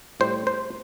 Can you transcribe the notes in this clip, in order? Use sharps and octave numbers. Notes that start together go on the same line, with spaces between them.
A2 G3 C5
C5